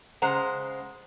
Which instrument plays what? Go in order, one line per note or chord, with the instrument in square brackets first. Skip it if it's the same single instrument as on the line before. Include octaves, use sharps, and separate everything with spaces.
[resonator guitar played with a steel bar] C#3 G#3 C5 F#5 A#5